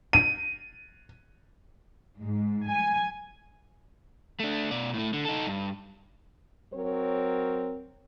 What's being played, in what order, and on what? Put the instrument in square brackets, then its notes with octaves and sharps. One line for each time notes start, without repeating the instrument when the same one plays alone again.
[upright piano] D#7
[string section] G#2
G#5
[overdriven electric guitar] A3 D4
B2 D5
A2 A3
D3
D#4 A4
G2
[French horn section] F#3 C4 A#4 C#5